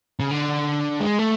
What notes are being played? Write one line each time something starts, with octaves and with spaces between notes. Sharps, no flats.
C#3
D3
G#3
A3